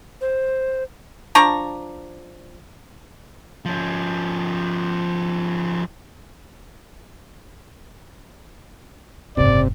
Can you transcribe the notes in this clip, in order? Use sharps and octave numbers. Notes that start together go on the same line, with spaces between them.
C5
F3 D4 A#5 C#6
F3 C#4
F#1 G#2 C3 D5